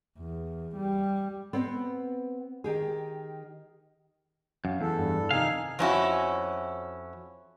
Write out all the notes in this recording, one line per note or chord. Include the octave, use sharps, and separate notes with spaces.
E2
G3
B3 C4
D#3 G4 G#4
F#2 F5
E2 A4
G2
F2 C3 D#3 D#4 F5 G#5
F2 C#4 E4 F#4